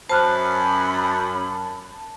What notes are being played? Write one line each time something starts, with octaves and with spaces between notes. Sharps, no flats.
F#2 C5 A5 B5 F6 F#6